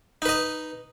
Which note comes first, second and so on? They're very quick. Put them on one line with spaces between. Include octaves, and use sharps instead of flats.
D#4 B4 D#5